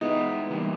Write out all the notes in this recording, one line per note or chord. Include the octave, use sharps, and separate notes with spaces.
G#3 B3 D#4 E4
E3 G3 A#3